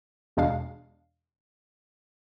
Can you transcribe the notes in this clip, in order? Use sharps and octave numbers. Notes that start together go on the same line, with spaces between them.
E2 B2 G#3 D4 F5